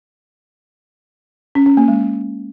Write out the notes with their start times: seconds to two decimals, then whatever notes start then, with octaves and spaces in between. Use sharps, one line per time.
1.55 C#4
1.66 C#4
1.77 A#3
1.88 G#3